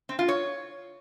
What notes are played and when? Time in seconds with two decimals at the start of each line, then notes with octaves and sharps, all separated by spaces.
0.09 C4
0.19 F4
0.28 C#5